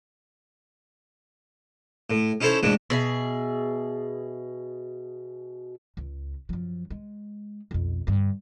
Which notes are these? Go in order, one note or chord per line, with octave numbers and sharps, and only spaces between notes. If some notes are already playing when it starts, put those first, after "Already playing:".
A2
C#4 D#4 E4 A4 C5 C#5
F2 A2 G#3 D4
B2 G#4 E5
C#2
F#2 F3
G#3
B1 F2
G2 D3